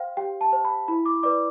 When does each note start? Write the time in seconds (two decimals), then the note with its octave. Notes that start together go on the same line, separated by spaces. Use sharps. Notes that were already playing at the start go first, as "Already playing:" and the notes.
Already playing: C5 F5 G5
0.17 G4 G5
0.41 A5
0.53 C5
0.65 B5
0.88 E4 B5
1.06 D6
1.23 B4 D5 D6